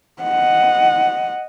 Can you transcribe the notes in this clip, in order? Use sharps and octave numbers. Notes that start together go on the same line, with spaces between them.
D#5 F#5